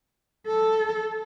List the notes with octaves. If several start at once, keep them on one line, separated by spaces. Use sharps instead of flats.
A4